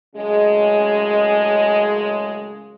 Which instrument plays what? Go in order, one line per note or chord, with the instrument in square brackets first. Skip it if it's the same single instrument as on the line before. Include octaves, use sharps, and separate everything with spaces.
[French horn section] F#2 A2 C#3 G#3